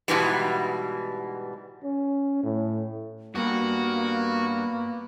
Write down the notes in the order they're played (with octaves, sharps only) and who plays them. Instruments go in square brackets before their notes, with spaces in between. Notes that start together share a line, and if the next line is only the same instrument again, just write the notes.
[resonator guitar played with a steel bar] G#2 B2 E3 G3
[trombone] C#4
A2
[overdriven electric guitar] G2 [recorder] A#3 [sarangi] B3 [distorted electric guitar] F#4